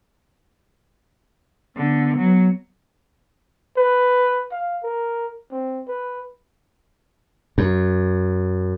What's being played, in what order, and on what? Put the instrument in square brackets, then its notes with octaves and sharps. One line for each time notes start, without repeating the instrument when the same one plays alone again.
[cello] D3 [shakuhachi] B3
[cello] F#3
[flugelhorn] B4
F5
A#4
C4
B4
[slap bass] F#2